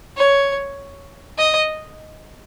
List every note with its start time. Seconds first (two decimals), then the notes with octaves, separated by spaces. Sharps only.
0.17 C#5
1.38 D#5